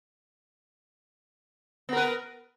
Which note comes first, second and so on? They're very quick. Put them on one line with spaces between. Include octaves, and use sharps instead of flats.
B3 A#4 B4